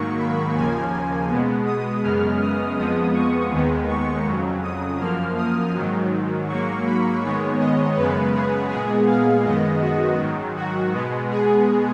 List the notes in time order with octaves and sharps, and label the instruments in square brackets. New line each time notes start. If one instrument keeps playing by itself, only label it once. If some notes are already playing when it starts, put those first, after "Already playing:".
Already playing: [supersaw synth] G#2 D#3 F#3 A#3 C#6
B5
D#2 C#3 F3 A#3 G#5
B2 G#3 B3
D#6
F#2 C#3 G#3 B3 F6
D#6
F2 F3 G#3 B3 D#6
C#6
D#2 D#3 G#3 B3
C#6
F2 C#3 F#3
D#6
F#2 F3 A#3 F6
D#6
G#2 D#3 F#3
G#2 F#3 A#3 C#6
B5
G#2 D#3 G#3 B3 C#5
D#5
F#2 C#3 G#3 B3 B4
G#4
A#2 G#3 B3 G#4
F5
F#2 D#3 G#3 B3 D#5
F#4
G#2 D#3 F#3
F#4
B2 G#3 B3
G#4